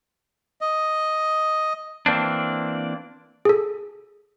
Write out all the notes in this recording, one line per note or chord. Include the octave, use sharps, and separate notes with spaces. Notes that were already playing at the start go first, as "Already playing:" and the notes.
D#5
E3 A#3 C4 D4
G#4 A4